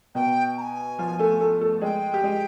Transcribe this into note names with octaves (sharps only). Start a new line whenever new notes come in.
B2 B3 G5
A#5
G#5
F3 F4
A3 A4
A3 A4
A3 A4
G#3 G#4 G5
G4
G#3 G#4